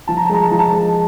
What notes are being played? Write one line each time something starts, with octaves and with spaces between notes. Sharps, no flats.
F3 A5
A#5
A5
G#3 A#5
A5
F3 A#5
A5
G#3